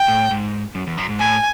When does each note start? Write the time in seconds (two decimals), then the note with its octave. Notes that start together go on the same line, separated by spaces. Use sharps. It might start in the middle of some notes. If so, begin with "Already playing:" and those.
Already playing: G5
0.08 A2
0.31 G#2
0.75 F#2
0.87 E2
0.97 F#2
1.09 G#2
1.19 A2 G#5